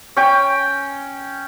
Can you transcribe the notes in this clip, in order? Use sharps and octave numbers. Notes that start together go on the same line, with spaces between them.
C#4 G5